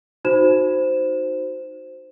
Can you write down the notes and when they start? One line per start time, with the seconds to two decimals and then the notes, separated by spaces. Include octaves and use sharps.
0.25 D#4 F#4 C5 E7